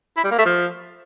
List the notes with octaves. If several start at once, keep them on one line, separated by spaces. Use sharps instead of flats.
E4
G3
A#3
A3
F3